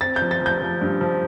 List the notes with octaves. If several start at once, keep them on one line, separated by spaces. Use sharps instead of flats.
C4 A6
G6
F3
A6
F3 G6
F3
G2
F3